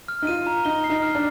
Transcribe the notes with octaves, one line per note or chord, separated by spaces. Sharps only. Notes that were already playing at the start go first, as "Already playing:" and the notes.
F6
D#4
F4 D#7
A#5
D#4 G7
C7
D#4
F6
D4